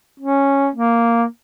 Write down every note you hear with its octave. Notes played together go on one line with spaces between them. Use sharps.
C#4
A#3